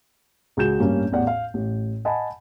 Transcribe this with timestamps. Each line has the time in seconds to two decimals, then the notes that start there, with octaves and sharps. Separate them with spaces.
0.57 C#2 F#4 G#4 G6 E7
0.80 A1 G2 A#3 C#4
1.12 A1 E2 D5 F#5
1.27 F5
1.54 A1
2.05 D#5 F#5 G#5 A5 B5